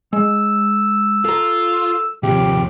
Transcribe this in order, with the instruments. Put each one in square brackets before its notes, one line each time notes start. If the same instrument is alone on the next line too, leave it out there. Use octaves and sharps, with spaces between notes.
[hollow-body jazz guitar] G#3 [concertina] E6
[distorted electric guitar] F4 [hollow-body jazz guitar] A4 A#5
[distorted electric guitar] D#2 F3 [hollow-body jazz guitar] C3 [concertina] G4